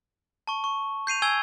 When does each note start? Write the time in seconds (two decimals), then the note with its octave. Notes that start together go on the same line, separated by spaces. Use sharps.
0.47 A5 C#6
0.64 C#6
1.07 G6 C7 D#7 F7
1.22 G#5 E6 G#6 G7